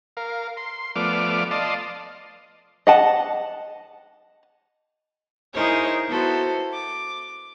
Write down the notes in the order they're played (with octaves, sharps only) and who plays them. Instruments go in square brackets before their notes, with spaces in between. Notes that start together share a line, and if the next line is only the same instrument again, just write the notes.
[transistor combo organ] A#4 F5
C6
F3 A3 B3 D5 D6 F6
D5 D#5 F5 A5 C6
[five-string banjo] D#5 F#5 A5
[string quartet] D#4 E4 G#4 A#4 C5 C#5
B3 E4 F#4 A4 C5
D6